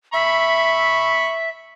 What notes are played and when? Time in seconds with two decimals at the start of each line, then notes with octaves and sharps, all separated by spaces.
0.14 E5 B5 C#6